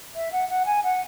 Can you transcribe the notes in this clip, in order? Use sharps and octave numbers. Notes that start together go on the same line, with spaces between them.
E5
F#5
F#5
G#5
F#5